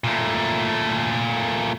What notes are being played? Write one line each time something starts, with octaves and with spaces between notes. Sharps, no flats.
A#2 A3